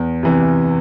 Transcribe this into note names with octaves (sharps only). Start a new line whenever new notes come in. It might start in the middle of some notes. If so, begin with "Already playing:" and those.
Already playing: E2
C3 E3